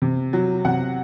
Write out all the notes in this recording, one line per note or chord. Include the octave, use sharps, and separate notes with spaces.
C3
F#3
C3 F#5